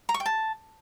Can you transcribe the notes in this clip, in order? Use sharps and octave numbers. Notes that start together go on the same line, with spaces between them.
A#5
C#6
G5
A5